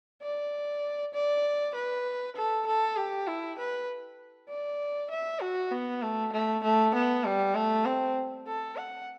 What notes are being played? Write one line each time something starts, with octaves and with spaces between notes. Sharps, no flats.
D5
D5
B4
A4
A4
G4
E4
B4
D5
E5
F#4
B3
A3
A3
A3
B3
G3
A3
C4
A4
F#5